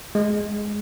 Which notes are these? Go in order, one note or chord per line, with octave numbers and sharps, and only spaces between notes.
G#3